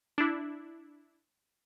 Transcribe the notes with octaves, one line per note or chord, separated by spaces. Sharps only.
D4 E4